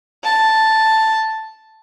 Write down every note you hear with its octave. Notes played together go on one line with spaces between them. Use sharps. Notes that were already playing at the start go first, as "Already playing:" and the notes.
A5